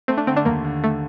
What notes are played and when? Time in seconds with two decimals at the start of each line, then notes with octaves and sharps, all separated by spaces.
0.08 A3 C4
0.17 D4
0.27 D3 C4
0.37 D4
0.45 D#2 A#3
0.65 D3
0.84 A3